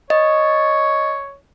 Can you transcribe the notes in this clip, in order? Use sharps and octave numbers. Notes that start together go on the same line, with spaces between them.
C#5 D#5